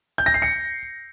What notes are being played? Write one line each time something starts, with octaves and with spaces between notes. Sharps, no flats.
G6
A#6
C7
C#7